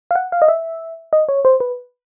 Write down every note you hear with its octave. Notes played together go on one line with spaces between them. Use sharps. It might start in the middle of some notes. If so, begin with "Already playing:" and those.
F5
F#5
F5
D#5
E5
D#5
C#5
C5
B4